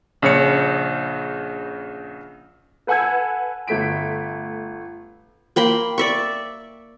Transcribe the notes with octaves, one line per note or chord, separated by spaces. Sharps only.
A#1 C#3 C#5 C#7
A4 B4 F#5 G#5 E6 G#6
G1 A3 B6 D7
A#3 G5 B5 C6
D5 E5 C#6